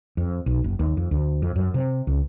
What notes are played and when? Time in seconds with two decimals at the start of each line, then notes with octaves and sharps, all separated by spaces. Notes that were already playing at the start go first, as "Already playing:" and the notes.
0.17 F2
0.46 B1
0.64 F#1
0.79 D#2
0.97 F2
1.11 D2
1.42 F2
1.56 F#2
1.74 C3
2.07 C#2